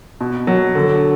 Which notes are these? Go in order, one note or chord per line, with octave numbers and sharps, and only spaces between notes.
B2
F#3
D3